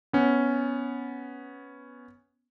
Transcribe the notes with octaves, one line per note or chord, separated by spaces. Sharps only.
B3 C#4